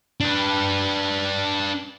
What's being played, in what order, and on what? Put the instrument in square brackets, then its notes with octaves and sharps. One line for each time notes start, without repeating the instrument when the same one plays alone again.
[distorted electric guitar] D4 B4